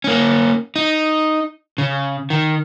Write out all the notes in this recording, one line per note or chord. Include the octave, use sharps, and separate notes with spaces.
A#3 C#4
D#4
C#3
D#3